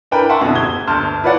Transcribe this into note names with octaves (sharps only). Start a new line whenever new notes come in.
D4 E4 A#4 B4 G5 A#5
E5 F#5 G5 A5 C6 C#6
F2 B2 D3 E3
F#1 G#6 G7
G1 D2 A5 C6 F6 G6
E4 F4 B4 C#5 D5 F#5